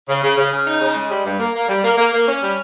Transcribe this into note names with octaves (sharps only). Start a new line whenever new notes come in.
C#3
C#3
C#3
C#3
D#4
C#3
G#3
G3
G2
A#3
A#3
G3
A#3
A#3
A#3
C#4
G3